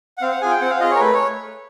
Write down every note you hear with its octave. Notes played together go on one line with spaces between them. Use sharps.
F#5
C4 F5
F#5
F4 G#4 G#5
G5
C4 F#5
F5
F4 G#4 D#5
A#4 C#5
A3 B4
C#5